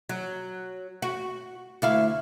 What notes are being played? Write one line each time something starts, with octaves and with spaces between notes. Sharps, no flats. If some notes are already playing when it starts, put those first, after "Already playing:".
F#3
F#4
D2 E4 F5